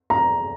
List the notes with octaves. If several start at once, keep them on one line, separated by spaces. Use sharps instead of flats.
A#5